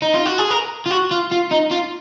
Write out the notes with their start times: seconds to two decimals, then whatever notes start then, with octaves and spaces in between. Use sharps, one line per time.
0.02 D#4
0.14 F4
0.26 F#4
0.38 G#4
0.51 A#4
0.86 F4
0.90 F#4
1.11 F4
1.31 F4
1.51 D#4
1.71 F4